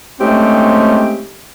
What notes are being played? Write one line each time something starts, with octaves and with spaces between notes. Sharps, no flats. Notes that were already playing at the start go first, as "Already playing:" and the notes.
G#3 A3 C4 C#4 D#4 G4